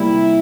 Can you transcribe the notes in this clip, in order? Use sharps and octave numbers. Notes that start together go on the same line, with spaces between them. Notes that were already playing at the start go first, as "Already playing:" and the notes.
Already playing: C3 G3 A#3 E4